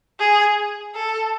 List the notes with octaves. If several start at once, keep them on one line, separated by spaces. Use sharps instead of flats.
G#4
A4